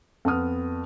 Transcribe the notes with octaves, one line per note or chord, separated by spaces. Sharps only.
F2 B3 F#5 D#6 F6